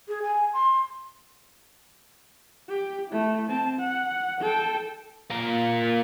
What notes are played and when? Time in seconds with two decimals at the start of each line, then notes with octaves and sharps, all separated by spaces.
0.08 G#4
0.23 G#5
0.54 C6
2.69 G4
3.10 A3 E4
3.48 C4 A5
3.80 F#5
4.41 A4 G5
5.31 A#3 F4